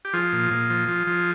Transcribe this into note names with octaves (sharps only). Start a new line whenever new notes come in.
G4
F3 F4 G#4
A#2
A#2
F3
F3
F3